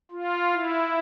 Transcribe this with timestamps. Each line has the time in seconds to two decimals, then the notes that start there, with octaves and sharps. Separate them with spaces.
0.11 F4
0.53 E4